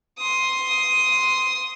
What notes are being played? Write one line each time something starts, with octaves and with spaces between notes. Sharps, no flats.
C6 D#6